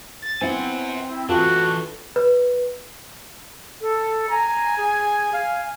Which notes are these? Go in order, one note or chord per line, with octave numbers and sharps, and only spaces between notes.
A6
B3 C4 E4 F#5 G#5
E4
E3 D4 F4 F#4 A4 B4
B4
A4
G#5 A#5
G#4
F5